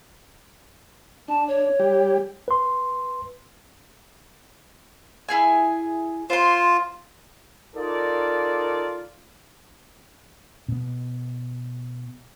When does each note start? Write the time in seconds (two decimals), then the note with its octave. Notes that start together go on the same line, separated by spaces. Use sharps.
1.28 D4 A5
1.48 C#5
1.80 G3 G4
2.48 B4 C6
5.28 E4 G#4 G#5
6.30 F4 C5 C6
7.76 D#4 F4 A4 A#4 D5
10.68 B2 B3